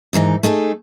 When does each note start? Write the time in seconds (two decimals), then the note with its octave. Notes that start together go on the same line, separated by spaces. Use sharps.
0.13 D#2 G#2 E3 D#4
0.43 A3 D#4 G#4 A4